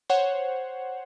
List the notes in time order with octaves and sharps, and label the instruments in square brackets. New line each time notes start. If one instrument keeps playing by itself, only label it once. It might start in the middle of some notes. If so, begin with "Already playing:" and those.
[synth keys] C5 C#5 F#5